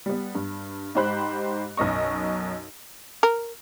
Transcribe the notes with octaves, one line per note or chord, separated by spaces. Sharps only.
G3 B3
G2
G#2 D#4 G4 C5 B5 F#6
B1 F#2 D#5 C#6
A#4